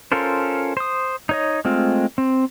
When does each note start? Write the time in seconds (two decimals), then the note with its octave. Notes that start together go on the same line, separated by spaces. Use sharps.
0.12 C#4 F4 A4 A#4 C5
0.77 C5 D#6
1.29 D#4 C#5 D#5
1.65 G#3 A3 C4 F4
2.18 C4